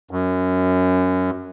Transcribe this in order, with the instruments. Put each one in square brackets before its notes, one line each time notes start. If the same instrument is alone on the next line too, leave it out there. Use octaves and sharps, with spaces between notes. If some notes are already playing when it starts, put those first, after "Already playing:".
[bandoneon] F#2